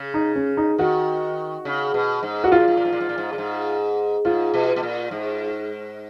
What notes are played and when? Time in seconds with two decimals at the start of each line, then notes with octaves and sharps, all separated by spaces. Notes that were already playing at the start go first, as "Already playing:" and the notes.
Already playing: C#3
0.14 D#4
0.36 C#4
0.57 D#4
0.78 D#3 F#4
1.65 C#3
1.94 B2
2.23 G#2
2.44 F#4
2.52 G#2 F4
2.60 A#2
2.68 G#2
2.77 A#2
2.85 G#2
2.93 A#2
3.01 G#2
3.09 A#2
3.18 G#2
3.33 A#2
3.38 G#2
4.25 G#2 F4
4.54 B2
4.76 B2
4.83 A#2
5.11 G#2